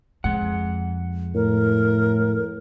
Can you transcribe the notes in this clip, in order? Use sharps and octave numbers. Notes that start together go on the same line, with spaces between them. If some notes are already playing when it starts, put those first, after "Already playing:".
F2 G#3 F#5
A2 A#4